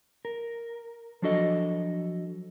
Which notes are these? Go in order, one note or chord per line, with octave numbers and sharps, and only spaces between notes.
A#4
F3 F#3 D4 F#4 A4 D#5